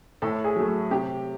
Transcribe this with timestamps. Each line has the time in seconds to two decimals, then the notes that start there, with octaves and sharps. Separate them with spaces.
0.22 A2 A4
0.44 G#4
0.56 F#3 A3
0.91 C3 G4